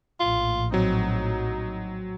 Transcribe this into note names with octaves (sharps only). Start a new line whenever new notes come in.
A#1 A2 F4
F#3 C4 D#4